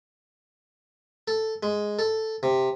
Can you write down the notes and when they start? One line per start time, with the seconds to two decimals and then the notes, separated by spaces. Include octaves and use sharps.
1.28 A4
1.63 G#3
1.99 A4
2.43 C3